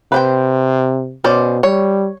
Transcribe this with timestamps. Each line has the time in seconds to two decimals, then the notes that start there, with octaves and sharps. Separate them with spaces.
0.12 C3 B4 C5 G5
1.24 B2 C#4 C5 D5
1.63 G3 C#5